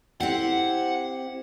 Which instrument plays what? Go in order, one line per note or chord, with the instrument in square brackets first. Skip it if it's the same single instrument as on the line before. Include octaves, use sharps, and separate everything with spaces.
[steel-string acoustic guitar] C4 E4 G4 [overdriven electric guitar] F#5